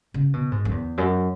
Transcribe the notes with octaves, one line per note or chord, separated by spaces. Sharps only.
C#3
B2
G#2
F#2
E2
F#2